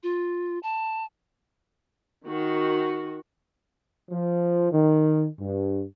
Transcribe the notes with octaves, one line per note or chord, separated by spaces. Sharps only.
F4
A5
D#3 F#4
F3
D#3
G2